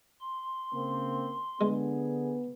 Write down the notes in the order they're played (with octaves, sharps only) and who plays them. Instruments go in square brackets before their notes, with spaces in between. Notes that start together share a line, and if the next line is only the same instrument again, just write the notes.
[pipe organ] C6
[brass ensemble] C#3 A#3 C4
[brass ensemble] D3 G#4 [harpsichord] G#3 [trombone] B3